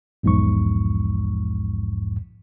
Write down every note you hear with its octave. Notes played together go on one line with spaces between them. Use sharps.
B1 E2 G#2 F3 C#6